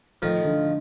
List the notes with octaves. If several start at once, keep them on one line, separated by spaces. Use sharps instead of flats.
D#3 F3 A3
D3